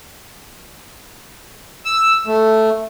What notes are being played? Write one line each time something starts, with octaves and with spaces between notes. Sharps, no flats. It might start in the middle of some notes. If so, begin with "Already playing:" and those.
E6
A3